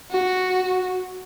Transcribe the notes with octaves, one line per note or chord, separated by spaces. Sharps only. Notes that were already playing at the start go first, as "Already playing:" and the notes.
F#4